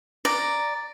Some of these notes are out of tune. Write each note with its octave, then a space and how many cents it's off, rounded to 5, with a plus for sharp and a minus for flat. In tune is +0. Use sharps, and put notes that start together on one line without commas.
D5 +0 A#5 +0